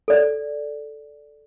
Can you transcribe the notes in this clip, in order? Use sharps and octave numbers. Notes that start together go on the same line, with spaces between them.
A4 D5